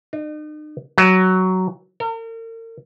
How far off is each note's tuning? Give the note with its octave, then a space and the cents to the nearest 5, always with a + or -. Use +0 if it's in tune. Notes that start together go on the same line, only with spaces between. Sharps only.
D#4 -40
F#3 +10
A#4 -40